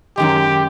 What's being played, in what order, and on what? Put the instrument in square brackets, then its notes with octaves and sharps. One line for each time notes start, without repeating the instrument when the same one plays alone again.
[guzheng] F#2 D#3 G#3 [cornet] G4